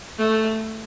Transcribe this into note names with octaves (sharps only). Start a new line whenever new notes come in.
A3